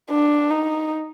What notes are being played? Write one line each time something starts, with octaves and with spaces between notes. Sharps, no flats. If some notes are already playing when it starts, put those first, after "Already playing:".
D4
D#4